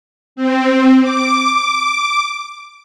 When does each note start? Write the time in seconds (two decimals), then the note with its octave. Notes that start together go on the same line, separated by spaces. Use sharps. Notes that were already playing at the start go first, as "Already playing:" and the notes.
0.36 C4
1.02 D6